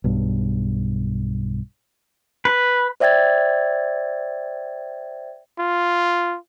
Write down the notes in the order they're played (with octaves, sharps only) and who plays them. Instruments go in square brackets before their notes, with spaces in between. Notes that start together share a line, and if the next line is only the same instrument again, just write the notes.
[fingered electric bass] B1 G2
[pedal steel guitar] B4
[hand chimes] C5 D5 E5 G5 G#6 A6
[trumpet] F4